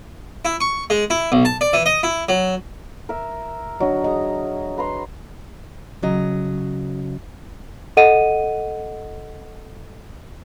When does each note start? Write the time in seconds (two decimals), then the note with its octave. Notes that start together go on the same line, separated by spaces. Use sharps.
0.45 E4
0.61 C#6
0.90 G#3
1.10 E4
1.32 B1
1.45 A5
1.61 D5
1.73 E3
1.86 D#5
2.03 E4
2.29 F#3
3.09 A#4 E5
3.80 F#3 D4 D#5
4.04 G#4 D#5 A#5
4.78 B4 A#5 C6
6.03 C#3 F#3 D#5
7.97 A4 D#5 F#5 D#7